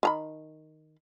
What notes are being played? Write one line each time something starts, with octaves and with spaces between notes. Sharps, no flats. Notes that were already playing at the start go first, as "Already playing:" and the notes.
D#3 A#5 B5